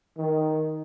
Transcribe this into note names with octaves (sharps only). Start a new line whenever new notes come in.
D#3